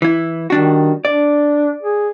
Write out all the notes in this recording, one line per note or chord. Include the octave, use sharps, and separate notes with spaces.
E3 E4
D#3 G3 D4 F#4
D4 D5
G#4